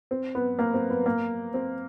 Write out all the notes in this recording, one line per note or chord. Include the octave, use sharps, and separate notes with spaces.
C4
B3
A#3
C4
B3
A#3
C4